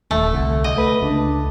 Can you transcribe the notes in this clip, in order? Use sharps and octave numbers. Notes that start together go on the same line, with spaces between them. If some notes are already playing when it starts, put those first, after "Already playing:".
D#1 A3
C2 D3
D3 D#5
A3 B4
C#2 D4